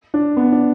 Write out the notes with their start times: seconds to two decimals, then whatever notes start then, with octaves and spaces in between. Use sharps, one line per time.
0.14 D4
0.37 B3
0.52 D4